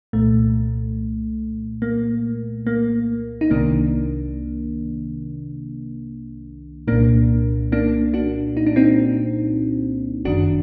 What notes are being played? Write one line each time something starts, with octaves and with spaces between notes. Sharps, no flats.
C2 A#2 A3
A#3
A#3
D#4
C2 C3 D#3 A#3 D4
C2 A#2 A#3 D4
A#3 D4
D4 F#4
D#4
D4
C4 D#4
G1 F#2 D#3 D4 F#4